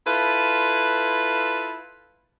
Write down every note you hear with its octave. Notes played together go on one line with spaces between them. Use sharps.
E4 F4 A4 B4